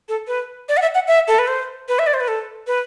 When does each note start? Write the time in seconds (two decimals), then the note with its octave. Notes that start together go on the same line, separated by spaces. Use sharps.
0.09 A4
0.28 B4
0.69 D5
0.77 F#5
0.82 E5
0.95 F#5
1.07 E5
1.28 A4
1.39 B4
1.48 C5
1.88 B4
1.99 E5
2.07 D5
2.14 C5
2.20 B4
2.28 A4
2.67 B4